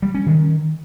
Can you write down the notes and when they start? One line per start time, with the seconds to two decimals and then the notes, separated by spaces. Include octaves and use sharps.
0.02 G3
0.14 C#4
0.26 D#3